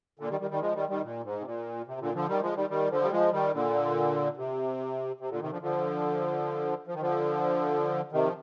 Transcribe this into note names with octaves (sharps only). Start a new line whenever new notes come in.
A#2 D3
D#3 G3
D#3 G3
D#3 G3
F3 G#3
D#3 G3
D#3 G3
A#2
G#2
C3
A#2
C3
A#2 D3
D3 F3
D#3 G3
F3 G#3
D#3 G3
D#3 G3
D3 F3
G3
F3 G#3
D#3 G3
A#2 D3
C3
C3
A#2 D3
C3 D#3
D3 F3
D3 F3
F3
D#3
D3 F3
C3 D#3
F3